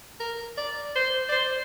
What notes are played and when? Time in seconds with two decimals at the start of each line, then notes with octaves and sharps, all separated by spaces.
0.20 A#4
0.57 D5
0.96 C5
1.29 D5
1.32 C5